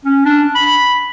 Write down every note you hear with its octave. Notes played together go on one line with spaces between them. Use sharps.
C#4
D4
B5